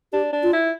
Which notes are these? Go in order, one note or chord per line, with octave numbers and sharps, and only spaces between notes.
D4 G4
D4
F4
E4